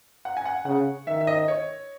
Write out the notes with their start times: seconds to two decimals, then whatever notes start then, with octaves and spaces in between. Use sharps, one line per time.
0.25 F#5
0.37 G#5
0.45 F#5
0.65 C#3 F#5
1.07 D#3 E5
1.20 E5
1.27 D#5
1.48 C#5